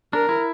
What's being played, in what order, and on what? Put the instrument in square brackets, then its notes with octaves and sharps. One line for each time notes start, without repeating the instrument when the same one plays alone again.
[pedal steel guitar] D4 [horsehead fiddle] A#4
[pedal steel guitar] E4